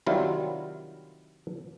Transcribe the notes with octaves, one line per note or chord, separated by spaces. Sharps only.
C3 D#3 F#3 G3 E4 F4